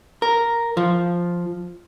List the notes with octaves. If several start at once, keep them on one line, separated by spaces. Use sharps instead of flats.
A#4
F3